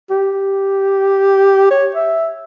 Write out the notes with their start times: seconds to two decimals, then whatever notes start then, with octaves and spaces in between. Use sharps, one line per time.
0.10 G4
1.70 C#5
1.95 E5